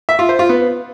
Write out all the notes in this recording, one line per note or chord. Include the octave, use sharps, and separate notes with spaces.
E5
F4
C5
F4
B3